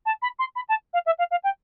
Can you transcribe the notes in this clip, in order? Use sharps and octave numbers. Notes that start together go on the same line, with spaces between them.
A5
B5
C6
B5
A5
F5
E5
F5
F5
G5